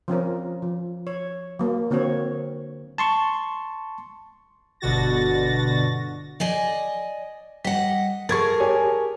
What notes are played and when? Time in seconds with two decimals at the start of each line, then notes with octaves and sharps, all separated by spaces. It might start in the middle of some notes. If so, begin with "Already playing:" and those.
0.08 F3 C4 C#4 A#4
0.62 F3
1.07 C#5
1.59 F#3 A#3
1.90 D3 A#3 C4 F#4 C#5
2.98 A5 C6 C#6
4.80 G1 B2 D3 F#4 A6 A#6
6.40 D5 D#5 G#5
7.65 G3 D#5 F#5
8.29 G#4 A#4 A5 C#6 G#6 A6
8.60 G4 C#5 G#5